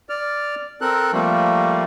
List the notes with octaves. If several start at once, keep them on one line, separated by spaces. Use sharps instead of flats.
D5 F6
C4 A4 A#4 F#6
F3 G3 A3 A#3